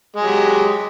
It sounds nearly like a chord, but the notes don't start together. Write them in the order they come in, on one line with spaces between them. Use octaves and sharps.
G#3 F#3 G4